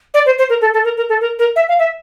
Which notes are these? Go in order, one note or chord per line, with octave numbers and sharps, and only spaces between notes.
D5
C5
C5
A#4
A4
A4
A#4
A#4
A4
A#4
A#4
E5
F5
E5